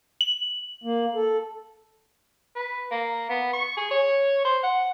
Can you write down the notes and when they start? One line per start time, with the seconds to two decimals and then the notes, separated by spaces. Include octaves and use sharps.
0.21 F#7
0.84 A#3
1.15 A4
2.56 B4
2.91 A#3
3.29 B3
3.53 C#6
3.77 G#4
3.91 C#5
4.45 C5
4.63 F#5